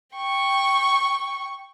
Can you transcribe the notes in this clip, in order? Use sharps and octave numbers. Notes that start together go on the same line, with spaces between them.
G5 C#6